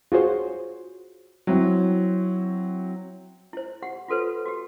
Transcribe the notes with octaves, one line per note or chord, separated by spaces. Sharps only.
F4 F#4 G#4 C5 C#5
F#3 C4 E4
E4 C5
G4 F#5
F4 F#4 A4 B4 C5
F#4 G4